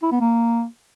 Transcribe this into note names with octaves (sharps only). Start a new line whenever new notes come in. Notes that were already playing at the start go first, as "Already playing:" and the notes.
E4
B3
A#3